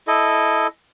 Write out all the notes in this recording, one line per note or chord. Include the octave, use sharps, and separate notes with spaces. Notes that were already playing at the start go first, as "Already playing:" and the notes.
E4 A4 D#5